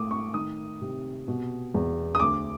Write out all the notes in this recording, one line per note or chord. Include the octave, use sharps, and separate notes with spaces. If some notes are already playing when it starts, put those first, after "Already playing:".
Already playing: A2 D6 D#6
C#6
D#3 D#6
C3
B2
E2
D#6
D2 D6